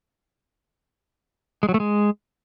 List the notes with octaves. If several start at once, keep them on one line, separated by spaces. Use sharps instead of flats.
G#3
F#3
A3
G#3